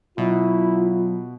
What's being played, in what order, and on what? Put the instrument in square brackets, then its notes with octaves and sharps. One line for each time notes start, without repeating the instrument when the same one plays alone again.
[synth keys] B2 [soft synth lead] F#3 [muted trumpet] E4 [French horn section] F4